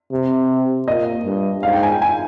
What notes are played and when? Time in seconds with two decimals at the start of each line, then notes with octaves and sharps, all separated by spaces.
0.12 C3
0.88 A#2 D#5
1.25 G2
1.63 G#2 F5
1.73 G5
1.83 G#5
1.92 G5
2.02 G#5